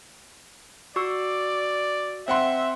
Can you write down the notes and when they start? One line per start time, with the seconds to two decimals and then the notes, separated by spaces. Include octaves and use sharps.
0.96 F#4 D5 C#6 E6
2.28 C4 E5 F#5 C6